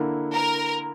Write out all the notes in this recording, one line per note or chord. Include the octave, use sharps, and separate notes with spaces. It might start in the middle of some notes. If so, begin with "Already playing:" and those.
Already playing: D3 A#3 E4
A#4